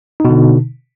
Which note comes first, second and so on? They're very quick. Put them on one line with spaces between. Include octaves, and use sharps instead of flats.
D#4 B2 D3